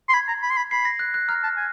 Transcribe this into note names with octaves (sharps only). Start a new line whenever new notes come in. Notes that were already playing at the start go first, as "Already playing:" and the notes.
C6
B5 G#6
A#5
B5
C6
B5
B5 C7
A#6
F#6
F#6
A#5 F6
A5
G#5